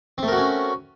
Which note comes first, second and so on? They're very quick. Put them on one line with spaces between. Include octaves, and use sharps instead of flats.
C4 A3 A#4 F#4 C#4